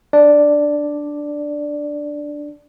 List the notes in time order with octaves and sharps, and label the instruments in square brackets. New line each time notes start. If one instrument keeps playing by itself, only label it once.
[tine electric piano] D4 D5